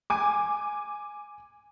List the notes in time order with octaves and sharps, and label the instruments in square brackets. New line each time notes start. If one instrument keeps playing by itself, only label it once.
[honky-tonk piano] G#5 D6